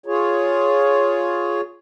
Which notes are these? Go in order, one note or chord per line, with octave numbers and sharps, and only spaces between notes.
F4 G#4 C#5